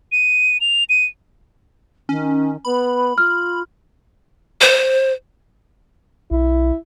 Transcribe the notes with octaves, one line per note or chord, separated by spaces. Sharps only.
D#7
F7
D#7
D#3 C#4
B3 B5
F4 F6
C5
B1 E4